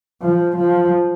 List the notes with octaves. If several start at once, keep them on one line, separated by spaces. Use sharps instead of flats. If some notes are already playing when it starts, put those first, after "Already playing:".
F3
F3